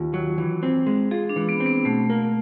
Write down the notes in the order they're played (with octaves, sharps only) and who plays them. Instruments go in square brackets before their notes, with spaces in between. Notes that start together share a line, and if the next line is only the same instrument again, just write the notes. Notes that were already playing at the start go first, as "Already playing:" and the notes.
Already playing: [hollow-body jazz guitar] D#2 [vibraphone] F4
[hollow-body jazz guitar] F#3
E3
C4
G#3
[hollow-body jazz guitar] F4 [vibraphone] G#4
[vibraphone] D4
[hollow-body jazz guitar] E3
[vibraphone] B3
[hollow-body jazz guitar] C4
[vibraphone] B3
[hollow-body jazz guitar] B2 [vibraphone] A3
[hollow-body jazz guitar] A#3